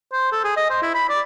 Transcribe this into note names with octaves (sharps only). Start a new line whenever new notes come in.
C5
A4
G#4
D#5
C5
E4
B5
D5